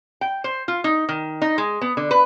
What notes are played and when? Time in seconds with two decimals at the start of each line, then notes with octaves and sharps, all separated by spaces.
0.21 G5
0.44 C5
0.68 F4
0.84 D#4
1.09 D#3
1.42 D#4
1.58 G#3
1.81 B3
1.97 D3
2.11 B4